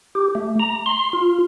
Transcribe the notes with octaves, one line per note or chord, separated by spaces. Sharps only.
G4
A3
A#5
C6
F4